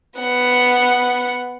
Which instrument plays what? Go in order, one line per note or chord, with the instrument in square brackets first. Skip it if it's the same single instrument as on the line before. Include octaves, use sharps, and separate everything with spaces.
[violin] B3 F#5